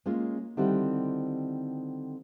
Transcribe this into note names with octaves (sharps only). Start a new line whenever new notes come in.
G#3 A#3 C#4 F4
D3 D#3 G3 C4 E4 F#4